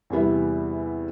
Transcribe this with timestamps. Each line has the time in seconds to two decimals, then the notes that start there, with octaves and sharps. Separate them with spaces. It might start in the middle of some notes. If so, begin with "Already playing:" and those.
0.10 E2 C3 G3 B3 E4